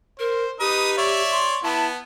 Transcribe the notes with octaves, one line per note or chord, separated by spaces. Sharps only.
A#4 C5
D#4 G4 B4 D#6
C#5 D5 E5
C6
B3 E4 A5